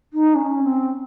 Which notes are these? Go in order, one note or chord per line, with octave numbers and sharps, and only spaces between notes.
D#4
C#4
C4